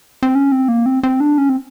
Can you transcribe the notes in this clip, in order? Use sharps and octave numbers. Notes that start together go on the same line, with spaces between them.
C4
C#4
C4
A#3
C4
C4
D4
C#4
C4